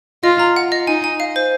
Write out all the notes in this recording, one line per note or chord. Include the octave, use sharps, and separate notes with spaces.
F4 D#5
A#5
F#5
D#5
D#4 G#5
G#5
F5
C5